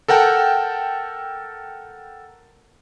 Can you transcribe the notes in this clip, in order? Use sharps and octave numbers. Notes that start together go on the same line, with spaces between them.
A4 A#4 F#5 G5 A5